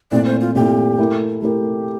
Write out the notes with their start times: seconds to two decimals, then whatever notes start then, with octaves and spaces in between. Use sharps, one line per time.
0.11 A#2 A3 C4 E4 D5
0.26 C5
0.41 F4
0.55 A#2 A3 C4 E4 G4
0.98 A3 E4 A#4
1.42 A3 E4 G4 A#4